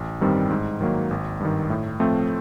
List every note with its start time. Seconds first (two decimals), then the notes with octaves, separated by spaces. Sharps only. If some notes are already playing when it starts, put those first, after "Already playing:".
Already playing: A1
0.21 G2 D#3 G3 C4
0.50 G#2
0.81 D#3 F#3 A#3
1.11 G#1
1.40 G2 D#3
1.70 A2
2.00 F3 A3 C4